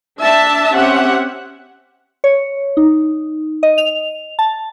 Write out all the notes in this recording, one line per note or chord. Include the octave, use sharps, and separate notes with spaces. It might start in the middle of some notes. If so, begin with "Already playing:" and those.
D4 E5 A5
C4 C#4 G4 E5 F#5
C#5
D#4
D#5
F7
A5